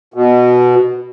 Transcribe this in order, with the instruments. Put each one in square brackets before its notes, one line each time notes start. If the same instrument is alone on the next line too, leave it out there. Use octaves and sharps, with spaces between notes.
[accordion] B2